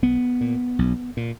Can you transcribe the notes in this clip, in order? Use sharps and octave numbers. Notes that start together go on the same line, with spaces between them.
B1 B3
A#2
B1
A#2